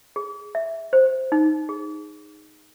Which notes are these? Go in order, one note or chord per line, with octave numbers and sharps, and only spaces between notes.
G#4
E5
C5
D#4
G#4